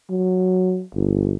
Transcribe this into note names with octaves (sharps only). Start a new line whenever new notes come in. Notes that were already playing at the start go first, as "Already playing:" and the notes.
F#3
G1